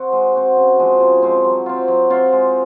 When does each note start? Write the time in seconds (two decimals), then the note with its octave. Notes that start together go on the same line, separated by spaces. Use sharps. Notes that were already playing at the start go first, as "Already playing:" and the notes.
Already playing: C4 F#4
0.12 G#3
0.35 C4 F#4
0.56 C#3
0.79 F3 G#3 C4
1.00 C#3
1.22 F3 G#3 C4
1.44 F#3
1.66 C4 F4
1.88 F#3
2.10 C4 F4
2.32 G#3